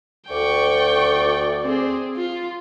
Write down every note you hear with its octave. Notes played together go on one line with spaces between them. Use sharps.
D2 D5 G5 C#6
C4 G#4
F4